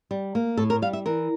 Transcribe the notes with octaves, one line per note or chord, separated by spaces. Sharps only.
G3
A#3
A2 A4
A#4
G3 F5
E5
E3 A#4